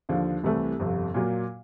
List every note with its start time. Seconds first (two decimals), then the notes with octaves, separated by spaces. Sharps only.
0.09 D#2 D3 F3
0.44 C2 C3 E3 A3
0.79 G1 F2 C3
1.14 A#2 F#3 A#3